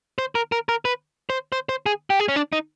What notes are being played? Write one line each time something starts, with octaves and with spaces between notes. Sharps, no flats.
C5
A#4
A#4
A#4
B4
C5
C5
C5
G#4
G4
G#4
C#4
D4
D#4